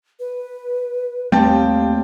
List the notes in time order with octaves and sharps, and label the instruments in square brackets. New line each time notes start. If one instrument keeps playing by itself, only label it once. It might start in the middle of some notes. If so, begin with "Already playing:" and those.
[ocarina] B4
[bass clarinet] D#2 [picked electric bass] G3 A3 C4 [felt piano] G5 A5